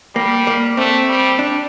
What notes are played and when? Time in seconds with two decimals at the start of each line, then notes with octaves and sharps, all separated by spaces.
0.15 G3 A#3
0.47 A#3
0.77 A3 C4
1.09 G3
1.39 D4